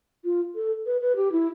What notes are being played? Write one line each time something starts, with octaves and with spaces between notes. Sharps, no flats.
F4
A4
B4
B4
G4
E4